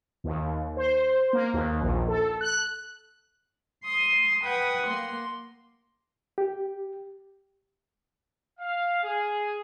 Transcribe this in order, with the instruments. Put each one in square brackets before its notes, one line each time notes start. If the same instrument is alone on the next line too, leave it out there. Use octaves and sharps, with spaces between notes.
[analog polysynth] D#2
C5
A#3
D#2
A#1
A4
F#6
[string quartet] C6 D#6
B4 F#5 G5 D#6 G#6
A#3 C6
[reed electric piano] G4
[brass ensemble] F5
G#4